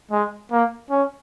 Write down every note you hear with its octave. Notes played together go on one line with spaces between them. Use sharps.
G#3
A#3
C#4